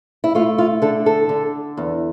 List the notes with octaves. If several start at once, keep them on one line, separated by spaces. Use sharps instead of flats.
E4
A3 F4
F4
D3 A4
A4
D3
E2